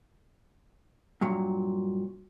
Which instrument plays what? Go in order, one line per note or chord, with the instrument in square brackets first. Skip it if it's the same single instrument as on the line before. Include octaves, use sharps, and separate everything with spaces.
[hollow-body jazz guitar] G2 A#2 F#3